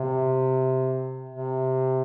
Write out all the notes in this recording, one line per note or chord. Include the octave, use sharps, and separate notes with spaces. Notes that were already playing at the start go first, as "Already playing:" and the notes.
Already playing: C3
C3